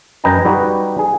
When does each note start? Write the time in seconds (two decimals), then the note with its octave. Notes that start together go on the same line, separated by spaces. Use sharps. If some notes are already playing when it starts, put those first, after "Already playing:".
0.24 F#2 B4 D#5 G5 G#5 A#5
0.45 G3 D#4 F#4 B4
0.99 G#4